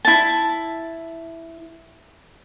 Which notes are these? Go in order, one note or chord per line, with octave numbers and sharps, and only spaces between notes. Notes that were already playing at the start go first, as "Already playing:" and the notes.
E4 A5